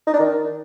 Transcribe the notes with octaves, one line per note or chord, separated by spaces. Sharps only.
D#4
D4
D#3